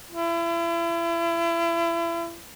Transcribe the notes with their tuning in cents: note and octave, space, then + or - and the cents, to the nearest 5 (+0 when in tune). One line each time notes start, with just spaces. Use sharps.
E4 +35